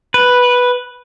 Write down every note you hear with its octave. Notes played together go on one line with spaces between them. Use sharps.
B4